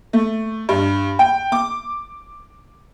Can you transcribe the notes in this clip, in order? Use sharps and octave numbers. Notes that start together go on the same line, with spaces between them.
A3
G2
G5
D6